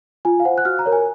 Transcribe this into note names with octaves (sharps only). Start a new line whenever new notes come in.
F4 G#5
F5
C5 F#5
F#6
F#4 F6
A#5
A#4 C#5
G#5